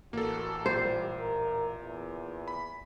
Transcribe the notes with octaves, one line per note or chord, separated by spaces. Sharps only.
A1 A#3 F#4 A4
A#2 G3 C5
A#4
E2
B5